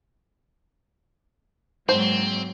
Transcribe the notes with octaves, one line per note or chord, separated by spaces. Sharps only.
G#2 F#3 A#3 C4 C5